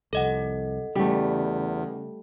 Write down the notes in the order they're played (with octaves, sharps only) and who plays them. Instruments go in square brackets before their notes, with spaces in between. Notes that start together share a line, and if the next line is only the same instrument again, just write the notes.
[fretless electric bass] C2 F2 [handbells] A4 D#5 F#5
[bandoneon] E2 [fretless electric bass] C#3 [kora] G3 A3